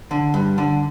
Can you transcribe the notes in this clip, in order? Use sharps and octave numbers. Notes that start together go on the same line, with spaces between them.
D3
G2
D3